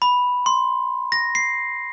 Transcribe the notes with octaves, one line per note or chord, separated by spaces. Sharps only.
B5
C6
A#6
C7